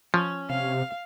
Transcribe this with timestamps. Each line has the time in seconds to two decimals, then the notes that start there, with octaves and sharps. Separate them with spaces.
0.14 F3 C#4
0.50 C3 F5